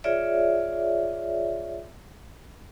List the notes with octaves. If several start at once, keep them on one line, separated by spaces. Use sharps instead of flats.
F4 G#4 C#5 D5 E5